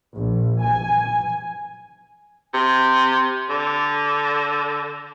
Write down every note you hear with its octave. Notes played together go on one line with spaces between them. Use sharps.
A#1
G#5
C3
D3